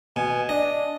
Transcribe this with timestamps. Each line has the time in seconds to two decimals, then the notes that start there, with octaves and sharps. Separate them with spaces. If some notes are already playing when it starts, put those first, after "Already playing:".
0.16 B2 G#5
0.49 D4 D#5